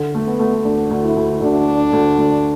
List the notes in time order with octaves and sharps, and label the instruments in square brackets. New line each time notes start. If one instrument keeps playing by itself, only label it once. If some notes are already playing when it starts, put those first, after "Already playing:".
Already playing: [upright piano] D3
A3
[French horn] B3
[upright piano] A3
[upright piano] D2 [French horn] D4
[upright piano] D2
[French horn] E4
[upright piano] D2
[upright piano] D2 [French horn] D4
[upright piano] D3
D2
D2